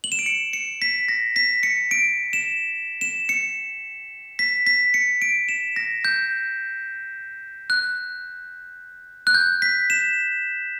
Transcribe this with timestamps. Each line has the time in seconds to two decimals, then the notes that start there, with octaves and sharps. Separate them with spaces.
0.04 F#7
0.12 E7
0.19 D7
0.26 C#7
0.53 C#7
0.82 B6
1.09 A#6
1.36 B6
1.63 C#7
1.91 D7
2.33 E7
3.01 E7
3.29 C#7
4.39 B6
4.67 B6
4.94 C#7
5.22 D7
5.49 E7
5.76 A#6
6.05 G6
7.70 F#6
9.27 F#6
9.35 G6
9.62 B6
9.90 E7